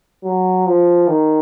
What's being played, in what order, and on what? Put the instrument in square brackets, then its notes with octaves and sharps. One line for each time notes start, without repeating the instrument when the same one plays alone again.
[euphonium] F#3
F3
D#3